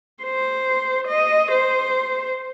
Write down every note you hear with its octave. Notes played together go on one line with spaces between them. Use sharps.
C5
D#5
C5